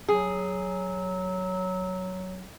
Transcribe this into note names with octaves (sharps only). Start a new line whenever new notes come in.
F#3 G#4